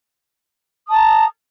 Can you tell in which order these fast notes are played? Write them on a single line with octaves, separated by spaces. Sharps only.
D#6 A5 A#5